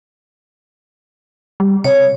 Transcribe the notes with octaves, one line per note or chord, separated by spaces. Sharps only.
G3
C3 C#5